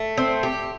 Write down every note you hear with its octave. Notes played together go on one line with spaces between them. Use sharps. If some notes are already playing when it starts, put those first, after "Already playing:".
Already playing: A3
C4
G4